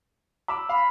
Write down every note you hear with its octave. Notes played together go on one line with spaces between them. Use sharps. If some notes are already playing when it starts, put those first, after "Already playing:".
B5 D6 E6
F5 B5